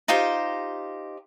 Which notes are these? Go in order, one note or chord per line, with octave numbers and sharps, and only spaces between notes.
D#4 F4 G4 C5